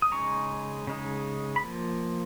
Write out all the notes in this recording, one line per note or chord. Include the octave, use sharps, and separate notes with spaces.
D#6
C#3 G#3 D#4 A#5 C#6
C#3 G#3 D#4
B5
F3 A#3